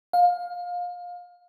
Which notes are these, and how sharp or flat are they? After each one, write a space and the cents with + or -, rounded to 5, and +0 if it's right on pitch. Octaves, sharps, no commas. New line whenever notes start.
F5 +25